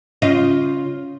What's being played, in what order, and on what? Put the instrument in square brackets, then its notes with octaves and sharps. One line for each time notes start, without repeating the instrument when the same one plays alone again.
[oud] C#3 F4 D#5